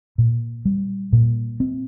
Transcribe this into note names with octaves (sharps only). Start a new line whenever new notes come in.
A#2
G3
A#2
C4